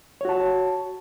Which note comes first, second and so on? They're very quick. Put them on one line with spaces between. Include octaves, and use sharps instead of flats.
C#5 F#4 A5